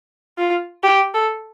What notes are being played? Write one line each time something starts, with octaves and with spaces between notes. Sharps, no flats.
F4
G4
A4